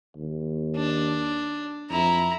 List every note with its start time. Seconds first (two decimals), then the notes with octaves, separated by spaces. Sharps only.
0.17 D#2
0.76 D4
1.90 F2 E4 A#5